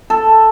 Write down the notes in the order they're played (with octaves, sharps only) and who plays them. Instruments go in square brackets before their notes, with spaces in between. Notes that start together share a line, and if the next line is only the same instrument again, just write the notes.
[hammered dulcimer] A4